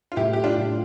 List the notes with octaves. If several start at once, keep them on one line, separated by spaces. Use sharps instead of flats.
F4
A2 E4 G4
G4
D4 F4
A2